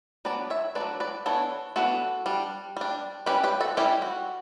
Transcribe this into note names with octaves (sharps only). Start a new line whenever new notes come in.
F#3 B3 D4 B4 D5
C#5 E5
B3 D4 B4 D5
F#3
B4 D5
E3 B3 D4 A4 C#5
E3 B3 D4 F#4 A4
G3 D4
G3 D4
E3 G3 C#4 G4 B4
G4 B4
F#4 A4
E3 G3 C#4 E4 G4
F#4